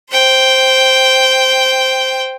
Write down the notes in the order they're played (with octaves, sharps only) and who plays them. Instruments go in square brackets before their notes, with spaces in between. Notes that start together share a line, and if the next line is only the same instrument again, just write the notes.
[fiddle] C5 G5